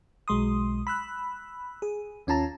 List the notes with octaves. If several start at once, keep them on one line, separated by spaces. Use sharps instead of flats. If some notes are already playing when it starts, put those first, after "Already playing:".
B1 G#3 C6 D#6
B5 E6 F#6
G#4
D#2 C#4 F4 A5 A#5